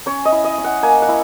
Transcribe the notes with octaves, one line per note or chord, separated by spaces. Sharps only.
C#4 C#5
D#5
E4
D#5
C#4
F#5
A#3 G#5
F#5
E4